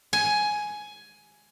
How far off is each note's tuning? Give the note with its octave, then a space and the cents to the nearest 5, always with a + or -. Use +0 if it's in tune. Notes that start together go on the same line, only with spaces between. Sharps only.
G#5 +10